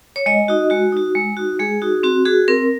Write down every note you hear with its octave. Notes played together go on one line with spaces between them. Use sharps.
C#5
G#3 D#5
D#4 F#4
G#3 F#4
D#4 F#4
G#3
D#4 F#4
G#3 G#4
D#4 F#4
C4 F#4
F#4 G#4
C4 A#4